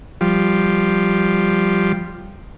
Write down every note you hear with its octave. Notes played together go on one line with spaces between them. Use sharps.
F3 G3